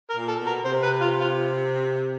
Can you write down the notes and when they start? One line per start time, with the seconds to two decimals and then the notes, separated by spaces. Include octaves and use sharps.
0.10 A#4
0.16 A#2
0.28 A4
0.40 B2
0.46 A#4
0.64 C3 C5
0.83 B4
1.01 F4
1.20 F4